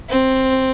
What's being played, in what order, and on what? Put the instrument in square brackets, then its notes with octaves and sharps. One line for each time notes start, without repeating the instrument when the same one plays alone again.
[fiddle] C4